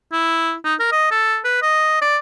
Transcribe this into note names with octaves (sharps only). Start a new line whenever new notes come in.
E4
D#4
A#4
D#5
A4
B4
D#5
D5